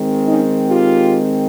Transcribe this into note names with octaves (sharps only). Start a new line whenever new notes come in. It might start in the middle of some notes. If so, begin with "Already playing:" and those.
Already playing: D#3 G#3 C4
C#4 D#4
F4 G4